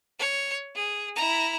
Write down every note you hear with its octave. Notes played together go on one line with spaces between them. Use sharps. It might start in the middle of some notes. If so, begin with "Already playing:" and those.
C#5
G#4
E4 A#5